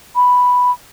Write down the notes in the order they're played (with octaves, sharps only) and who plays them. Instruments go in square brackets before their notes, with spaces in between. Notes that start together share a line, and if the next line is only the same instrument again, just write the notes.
[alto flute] B5